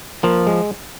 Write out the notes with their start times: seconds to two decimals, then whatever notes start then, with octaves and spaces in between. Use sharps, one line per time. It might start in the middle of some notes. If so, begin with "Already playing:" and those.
0.23 F3 A#3
0.47 G#3